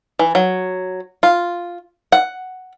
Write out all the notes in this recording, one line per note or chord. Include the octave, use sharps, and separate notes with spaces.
E3
F#3
F4
F#5